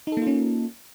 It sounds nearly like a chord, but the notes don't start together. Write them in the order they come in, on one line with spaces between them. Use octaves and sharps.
D#4 A4 A#3 F4 C#4